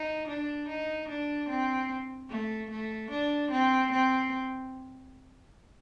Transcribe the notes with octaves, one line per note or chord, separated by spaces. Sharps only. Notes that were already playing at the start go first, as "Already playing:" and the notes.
Already playing: D#4
D4
D#4
D4
C4
A3
A3
D4
C4
C4